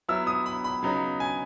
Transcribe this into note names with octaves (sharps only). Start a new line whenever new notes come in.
F#3 B3 E4 E6
D#6
B5
B5
C#3 F#3 B3 D#4
G#5